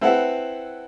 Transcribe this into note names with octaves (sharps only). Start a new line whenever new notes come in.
C4 E4 A4 B4 F#5